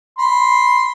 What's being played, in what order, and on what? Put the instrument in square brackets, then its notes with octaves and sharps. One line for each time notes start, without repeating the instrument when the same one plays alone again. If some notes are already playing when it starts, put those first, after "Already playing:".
[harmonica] B5 C6